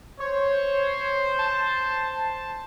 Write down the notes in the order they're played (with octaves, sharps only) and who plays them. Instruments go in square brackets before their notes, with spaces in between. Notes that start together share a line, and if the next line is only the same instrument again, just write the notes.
[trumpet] C5 [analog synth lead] C#5
[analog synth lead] A5